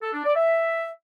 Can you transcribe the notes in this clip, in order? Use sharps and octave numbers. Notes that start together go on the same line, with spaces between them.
A4
D4
D5
E5